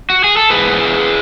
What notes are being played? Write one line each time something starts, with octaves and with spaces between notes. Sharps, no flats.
F#4
G#4
A4
G#2 G#4 B4
B3
G#3
G#3